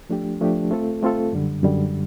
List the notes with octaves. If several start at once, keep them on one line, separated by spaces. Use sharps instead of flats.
F3 A3 D4 G4
F3 A3 D4 G4
A3 C4 F4 A4
A3 C4 F4 A4
F#2 D3 G3
F#2 D3 G3